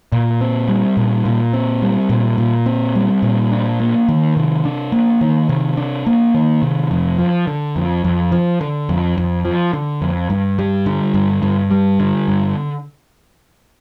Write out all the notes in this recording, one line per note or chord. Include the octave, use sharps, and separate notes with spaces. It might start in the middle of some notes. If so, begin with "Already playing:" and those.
A#2
C4
G3
A#2
A#2
C4
G3
A#2
A#2
C4
G3
A#2
D4
A#3
D#3
C3
D4
A#3
D#3
C3
D4
A#3
D#3
C3
F2
F3
D3
F2
F2
F3
D3
F2
F2
F3
D3
F2
G2
G3
D3
G2
G2
G3
D3
G2